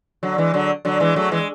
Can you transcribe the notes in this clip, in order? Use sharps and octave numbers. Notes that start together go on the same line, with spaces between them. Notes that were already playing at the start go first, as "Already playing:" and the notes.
D3 F#3
E3 G#3
D3 F#3
D3 F#3
E3 G#3
F#3 A3
E3 G#3